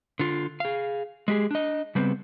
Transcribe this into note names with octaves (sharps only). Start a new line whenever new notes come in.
D3 F4
G#4 F5
G#3 G4 G#4
D4 D#5
C#3 G3 B3 C4